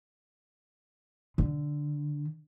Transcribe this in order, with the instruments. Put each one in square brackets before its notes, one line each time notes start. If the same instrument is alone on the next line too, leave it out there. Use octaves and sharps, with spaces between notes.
[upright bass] D3